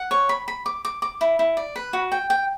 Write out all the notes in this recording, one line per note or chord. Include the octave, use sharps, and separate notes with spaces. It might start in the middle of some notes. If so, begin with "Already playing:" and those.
Already playing: F#5
C#5
B5
B5
D6
D6
D6
E4
E4
D5
B4
F#4
G5
G5